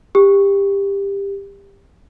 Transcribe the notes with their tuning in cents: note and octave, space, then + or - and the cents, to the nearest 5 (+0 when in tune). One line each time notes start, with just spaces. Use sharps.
G4 +20